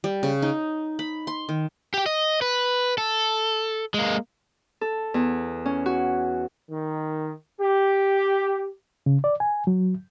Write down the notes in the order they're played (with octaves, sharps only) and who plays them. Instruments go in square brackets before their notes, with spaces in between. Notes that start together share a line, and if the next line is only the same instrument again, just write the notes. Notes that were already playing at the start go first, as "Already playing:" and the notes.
[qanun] G3
C#3
D#4
B5
C6
D#3
[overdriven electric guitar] G4 G5
D#5
B4
A4
G#3 A#3
[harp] A4
E2
C#4
F#4
[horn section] D#3
G4
[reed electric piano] C#3
D5
G#5
F#3